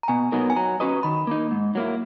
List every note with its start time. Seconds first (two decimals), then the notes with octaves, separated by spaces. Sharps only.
0.03 A#5
0.08 B2 G#5
0.32 F#3 B3 D#4 A#4
0.50 G#5
0.56 F#3 A#5
0.80 C#4 F#4 B4 D#5
1.03 D#3 B5
1.27 A#3 D#4
1.51 G#2
1.75 F#3 A#3 E4